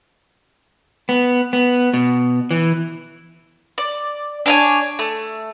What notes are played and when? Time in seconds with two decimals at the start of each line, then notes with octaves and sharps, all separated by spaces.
1.09 B3
1.53 B3
1.94 B2
2.51 E3
3.78 D5
4.46 D4 C#5 G#5
4.99 A3